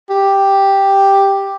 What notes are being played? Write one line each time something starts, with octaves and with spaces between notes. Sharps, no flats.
G4